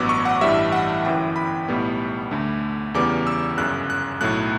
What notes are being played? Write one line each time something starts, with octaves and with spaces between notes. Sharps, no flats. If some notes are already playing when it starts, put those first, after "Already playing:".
Already playing: A1 G2 F#3 B3 D6 E6
C#6
F#5
A1 G2 E3 G3 E5
F#5
G1 F#2 E3 G5
B5
B1 A2 G3 B3
D2 D3 A3
E2 C#3 G3 B3 D6
E6
G1 F#2 C#3 F#6
F#6
B1 A2 F#3 A3 F#6